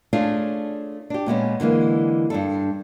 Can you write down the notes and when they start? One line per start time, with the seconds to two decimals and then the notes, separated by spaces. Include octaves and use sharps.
0.13 A3 C#4 D4 F4 G#4
1.10 D4 G4
1.26 A#2 G#3 B3 C#4
1.60 D3 E3 G#3 A#3
2.30 G2 D4 A4